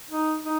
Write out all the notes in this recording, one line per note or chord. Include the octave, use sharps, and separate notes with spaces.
D#4
D#4